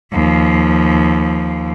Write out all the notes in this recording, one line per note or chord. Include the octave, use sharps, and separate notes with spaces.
D#2 F3